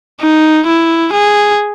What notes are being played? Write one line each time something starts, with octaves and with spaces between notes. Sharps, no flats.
D#4
E4
G#4